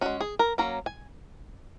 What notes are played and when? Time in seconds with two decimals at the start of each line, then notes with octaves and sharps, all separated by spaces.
0.01 G#3 C#4 F#4
0.21 G#4
0.39 A#4
0.58 F#3 A#3 C#4 A#5
0.86 G#5